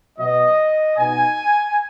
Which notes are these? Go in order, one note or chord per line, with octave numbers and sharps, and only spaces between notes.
B2 F#3 B3 D#5
B2 B3 D#4 G#5